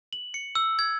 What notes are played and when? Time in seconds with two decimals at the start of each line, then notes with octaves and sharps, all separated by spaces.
0.13 F#7
0.34 C#7
0.55 E6
0.79 G#6